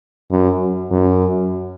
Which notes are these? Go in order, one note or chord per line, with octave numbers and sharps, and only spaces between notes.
F#2
F#2